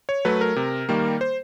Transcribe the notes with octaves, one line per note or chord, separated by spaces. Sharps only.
C#5
F#3 A3 B4
A#4
C3
D#3 G3 A#3
C5